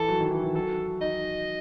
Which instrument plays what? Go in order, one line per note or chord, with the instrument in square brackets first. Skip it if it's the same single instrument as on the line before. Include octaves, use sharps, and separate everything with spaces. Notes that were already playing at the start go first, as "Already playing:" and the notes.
Already playing: [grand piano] E3 [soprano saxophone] A4
[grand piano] F#3
D#3
E3
E3
[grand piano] F#3 [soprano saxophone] A4
[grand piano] D#4 [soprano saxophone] D#5